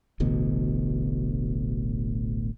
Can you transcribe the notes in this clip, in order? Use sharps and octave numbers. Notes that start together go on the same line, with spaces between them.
D1 A1 D2 B2